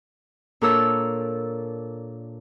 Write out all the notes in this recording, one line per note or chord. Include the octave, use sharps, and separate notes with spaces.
A#2 D4 A4 A#4 C#5 E6